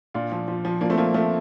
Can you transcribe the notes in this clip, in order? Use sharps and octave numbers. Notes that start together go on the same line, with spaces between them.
A#2 D4 F4
F3
F3
F3
F3 A#3 D4
A3 C4
F3 A#3
F3 A3